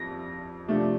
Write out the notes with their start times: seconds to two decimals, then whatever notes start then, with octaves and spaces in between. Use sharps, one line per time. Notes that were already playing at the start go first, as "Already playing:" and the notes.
Already playing: F2 G3 A#6
0.68 C3 F3 A3 D4